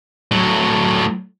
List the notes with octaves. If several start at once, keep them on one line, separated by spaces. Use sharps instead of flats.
A2 F#3